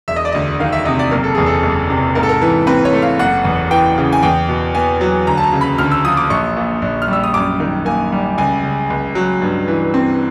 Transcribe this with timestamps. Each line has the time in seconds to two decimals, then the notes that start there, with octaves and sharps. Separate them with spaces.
0.08 E1 E5
0.16 D#5
0.25 D5
0.32 D2 D#5
0.60 D#3 F5
0.73 E5
0.85 C3 D#5
0.99 D5
1.11 F#1 A#4
1.24 A4
1.35 E2 G#4
1.46 A4
1.63 F#1
1.90 C3
2.15 G#2 A#4
2.23 A4
2.29 A#4
2.42 E3
2.67 C4 B4
2.85 C#5
2.93 A3
3.02 F5
3.19 F#1 F#5
3.45 E2
3.71 E3 G5
3.98 C#3
4.13 G#5
4.23 E2 G5
4.49 B2
4.75 B3 G#5
5.01 F#3
5.27 D2 A#5
5.37 A5
5.43 A#5
5.53 C#3
5.61 B5
5.78 D2 F6
5.91 E6
6.05 F3 D#6
6.17 D6
6.30 A#1 C#6
6.56 A#2
6.82 A#1
7.02 F6
7.08 G3 E6
7.24 D#6
7.34 F#2 D6
7.60 D#3
7.85 A#3 G#5
8.12 G3
8.38 C#2 G#5
8.64 C#3
8.90 C#2
9.15 F#3
9.42 G2
9.68 E3
9.94 C4